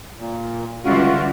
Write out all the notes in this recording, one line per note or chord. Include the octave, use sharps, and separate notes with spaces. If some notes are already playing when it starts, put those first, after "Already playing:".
A#2
C#2 D3 E3 G3 F4 F#4